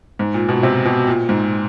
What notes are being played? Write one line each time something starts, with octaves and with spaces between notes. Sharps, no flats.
G#2
A#2
B2
C3
B2
A#2
G#2